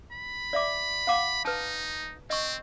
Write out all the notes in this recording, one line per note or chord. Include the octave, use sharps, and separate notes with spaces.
B5
D5 E5 D6
F5 F#5 D6
D#4 B4 A5
C4 D#5 C#6